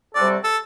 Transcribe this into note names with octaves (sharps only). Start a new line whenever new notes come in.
C3 G3 C4 F#4 A4 D5
A4